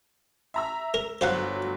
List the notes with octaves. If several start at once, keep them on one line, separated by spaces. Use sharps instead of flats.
E5 A#5 E6
A#4
G1 F#3 C5 F5 F#5 F#6